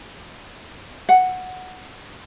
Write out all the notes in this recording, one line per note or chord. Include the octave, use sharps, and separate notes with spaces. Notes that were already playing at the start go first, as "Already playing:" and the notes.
F#5